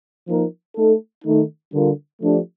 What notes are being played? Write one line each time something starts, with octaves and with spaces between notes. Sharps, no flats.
F3 A#3 D#4 A#4
A3 D#4 A4
D#3 A3 D#4
D3 G3 D4 F4 A#4
F3 A3 D4 G4